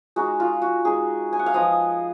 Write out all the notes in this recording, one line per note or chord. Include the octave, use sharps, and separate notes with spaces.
G#3 D#4 F#4
F4
F#4
G#3 D#4 G#4
G#5
F#5
F5
F3 B3 F4 D#5